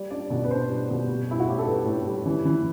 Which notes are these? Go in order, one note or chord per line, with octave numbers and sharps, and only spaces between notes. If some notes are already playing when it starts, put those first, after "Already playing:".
Already playing: G3 D5
D4 D5
B2
B4
D4 C5
G3
B2
G3
G3 E4
F#4
A2 G4
A4
A2 B4
A2
G3
E3
E3